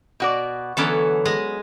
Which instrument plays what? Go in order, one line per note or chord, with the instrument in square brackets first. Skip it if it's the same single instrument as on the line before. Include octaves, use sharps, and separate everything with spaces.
[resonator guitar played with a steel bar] B2 F#4 D5
[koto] D3 E3 A4 [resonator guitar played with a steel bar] F#3 B3 C#4
[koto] G#3 D#5